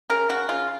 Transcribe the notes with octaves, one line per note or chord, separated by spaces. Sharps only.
C#3 A#4
C#3 F#4
C#3 F4